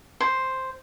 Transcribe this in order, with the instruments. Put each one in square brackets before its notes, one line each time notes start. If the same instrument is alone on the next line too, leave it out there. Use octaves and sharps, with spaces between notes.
[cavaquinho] C5